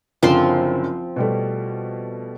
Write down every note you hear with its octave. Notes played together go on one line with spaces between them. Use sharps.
F#1 F#2 D3 F3 C4 C6
B2 G3 A3